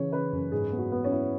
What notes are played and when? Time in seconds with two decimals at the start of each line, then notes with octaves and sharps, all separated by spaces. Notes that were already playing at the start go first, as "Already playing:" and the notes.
Already playing: C#3 E3 C#5
0.12 C#3 B4
0.32 F#2
0.52 G#2 G#4
0.72 B3
0.78 F#4
0.92 B3
1.04 C#4
1.12 E4